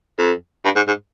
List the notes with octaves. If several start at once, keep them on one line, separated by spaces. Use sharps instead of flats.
F2
G2
G#2
G#2